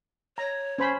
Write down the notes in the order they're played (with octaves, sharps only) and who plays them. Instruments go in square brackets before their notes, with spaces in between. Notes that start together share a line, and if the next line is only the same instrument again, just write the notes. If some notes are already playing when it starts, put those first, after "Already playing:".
[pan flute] C#5 [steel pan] A#5
[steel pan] C#4 C5 B5